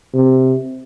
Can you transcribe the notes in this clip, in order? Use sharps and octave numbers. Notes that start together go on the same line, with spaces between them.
C3